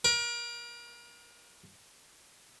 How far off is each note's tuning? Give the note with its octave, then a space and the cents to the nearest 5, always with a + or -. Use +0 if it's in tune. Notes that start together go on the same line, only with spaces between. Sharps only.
A#4 +35